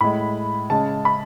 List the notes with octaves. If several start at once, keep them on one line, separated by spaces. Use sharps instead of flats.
A2 G#3 B5
C#3 G#3 A5
B5